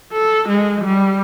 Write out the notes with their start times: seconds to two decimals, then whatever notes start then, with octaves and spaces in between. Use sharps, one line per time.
0.12 A4
0.48 G#3
0.84 G3